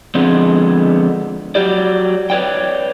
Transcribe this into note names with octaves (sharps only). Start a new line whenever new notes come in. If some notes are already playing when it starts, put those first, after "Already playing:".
D3 F3 G#3 B3 C4
F#3 G4 D5
B4 C#5 D5 G5